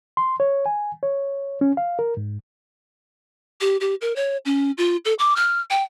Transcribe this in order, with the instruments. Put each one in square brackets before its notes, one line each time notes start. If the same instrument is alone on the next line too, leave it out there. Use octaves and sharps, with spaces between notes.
[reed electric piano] C6
C#5
G#5
C#5
C#4
F5
A#4
G#2
[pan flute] G4
G4
A#4
C#5
C#4
F4
A4
D6
F6
G5